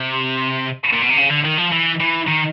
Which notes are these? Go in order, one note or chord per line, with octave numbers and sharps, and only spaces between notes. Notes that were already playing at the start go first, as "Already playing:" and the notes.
Already playing: C3
A#2
B2
C3
C#3
D3
D#3
F3
E3
E3
D#3